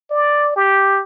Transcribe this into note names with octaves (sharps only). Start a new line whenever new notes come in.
D5
G4